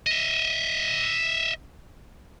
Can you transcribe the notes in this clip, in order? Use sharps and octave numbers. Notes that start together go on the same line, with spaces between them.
D#5 E5